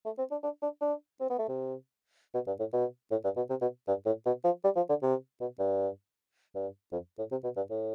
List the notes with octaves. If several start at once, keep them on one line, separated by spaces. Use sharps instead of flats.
A3
C4
D4
D4
D4
D4
C4
B3
A3
C3
B2
G2
A2
B2
A2
G2
B2
C3
B2
G2
A2
B2
F3
G3
F3
D3
C3
B2
G2
G2
F2
A2
C3
B2
G2
A2